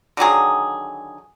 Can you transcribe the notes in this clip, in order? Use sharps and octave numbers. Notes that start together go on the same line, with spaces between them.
D3 D#3 F#3 G#4